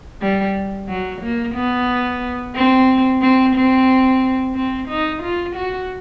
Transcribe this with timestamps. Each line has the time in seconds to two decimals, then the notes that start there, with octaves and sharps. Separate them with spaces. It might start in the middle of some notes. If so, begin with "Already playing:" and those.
0.21 G3
0.88 F#3
1.22 A#3
1.55 B3
2.56 C4
3.22 C4
3.56 C4
4.55 C4
4.89 D#4
5.23 F4
5.56 F#4